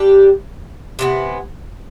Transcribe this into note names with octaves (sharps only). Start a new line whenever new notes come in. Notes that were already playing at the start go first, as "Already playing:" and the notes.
Already playing: G3 D4 G4
C3 E3 B3